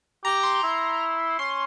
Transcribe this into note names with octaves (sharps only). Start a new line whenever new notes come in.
G4 A#5
C6
E4
C#4 C6